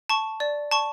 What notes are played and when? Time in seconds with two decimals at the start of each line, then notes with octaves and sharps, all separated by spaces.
0.10 A5 C#6
0.40 D5
0.71 A5 C#6